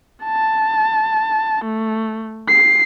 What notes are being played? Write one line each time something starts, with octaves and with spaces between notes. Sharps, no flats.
A5
A3
C7